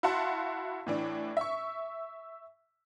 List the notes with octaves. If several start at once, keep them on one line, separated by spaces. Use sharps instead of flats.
E4 F#4 F5 F#5 A5 C6
A2 E3 D4
E5 C#6